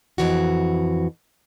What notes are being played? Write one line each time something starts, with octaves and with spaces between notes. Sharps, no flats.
F2 E3 F#4